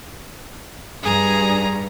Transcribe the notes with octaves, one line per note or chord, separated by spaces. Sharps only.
G2 G#4 A#5